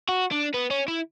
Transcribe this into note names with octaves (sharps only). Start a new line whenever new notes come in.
F#4
D4
B3
C#4
E4